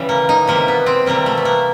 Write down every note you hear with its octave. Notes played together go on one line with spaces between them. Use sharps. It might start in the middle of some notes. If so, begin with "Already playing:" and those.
Already playing: C#3 E3 G3
A#3
D#4
C3 E3 G3 A#3
B3
C4
C3 E3 G3 A#3
A3
B3
A#3